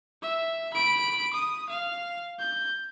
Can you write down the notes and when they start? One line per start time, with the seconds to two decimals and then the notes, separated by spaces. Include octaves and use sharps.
0.22 E5
0.74 B5 D7
1.33 D#6
1.69 F5
2.39 G6